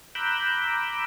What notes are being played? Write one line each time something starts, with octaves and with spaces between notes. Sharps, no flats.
A#5 B5 D6 E6 F#6 G6